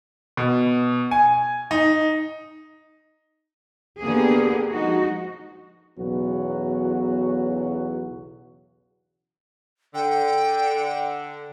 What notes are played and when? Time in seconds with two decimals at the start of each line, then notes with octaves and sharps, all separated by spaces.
0.37 B2
1.11 G#5
1.71 D#4
3.99 D3 A#3 B3 G4 G#4
4.72 F3 G#3 D#4 F#4
5.98 B1 E2 C#3 F#3 B3 F#4
9.95 D3 G5